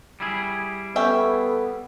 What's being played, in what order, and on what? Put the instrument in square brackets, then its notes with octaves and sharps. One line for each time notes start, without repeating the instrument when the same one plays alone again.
[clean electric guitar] G3 E4 G#4
[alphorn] B3 [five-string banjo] C#4 E5 G5 [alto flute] A4